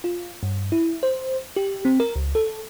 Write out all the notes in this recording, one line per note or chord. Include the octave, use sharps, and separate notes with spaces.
F4
G2
E4
C5
G4
C4
A#4
C#2
A4